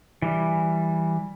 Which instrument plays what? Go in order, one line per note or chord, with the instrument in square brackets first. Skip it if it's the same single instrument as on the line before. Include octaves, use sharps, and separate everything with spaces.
[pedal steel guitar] E3 G3